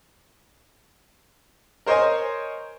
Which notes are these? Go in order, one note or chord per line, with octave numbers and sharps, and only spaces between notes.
A#4 C5 C#5 D#5 G#5